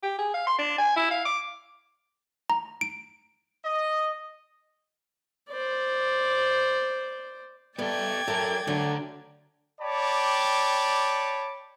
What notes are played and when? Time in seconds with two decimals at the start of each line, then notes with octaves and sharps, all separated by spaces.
0.03 G4
0.19 G#4
0.34 F5
0.47 C6
0.59 D4
0.79 G#5
0.96 E4
1.11 F5
1.25 D6
2.50 A#5
2.81 D7
3.63 D#5
5.50 C5 D5
7.78 G3 A3 B3 A4 D5 G5 G#6
8.28 F#3 A3 A4 A#4
8.67 D3 F#3 A3 D4 A4
9.81 C#5 D5 G5 A5 B5 D6